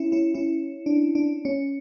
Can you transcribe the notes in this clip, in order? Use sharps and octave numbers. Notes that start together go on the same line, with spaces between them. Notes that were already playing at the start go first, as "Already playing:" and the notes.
Already playing: C#4 E4
C#4 E4
C#4 E4
D4
D4
C#4